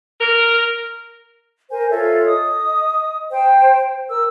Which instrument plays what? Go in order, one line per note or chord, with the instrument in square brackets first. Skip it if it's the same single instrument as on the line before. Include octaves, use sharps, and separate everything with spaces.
[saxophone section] A#4
[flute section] A#4 C5 G#5
F4 A4 C#5 E5
D#5 D#6
C5 G5
A#4 E6